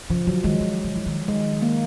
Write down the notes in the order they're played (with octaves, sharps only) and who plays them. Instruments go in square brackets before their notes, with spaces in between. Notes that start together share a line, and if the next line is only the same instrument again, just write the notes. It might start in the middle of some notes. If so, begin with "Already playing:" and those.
[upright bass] C#3 [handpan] F3
[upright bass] D3 [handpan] F#3
[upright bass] D#3 [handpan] G#3
[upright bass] D#3
D3
E3
D#3
[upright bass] D#3 [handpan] G#3
[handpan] A#3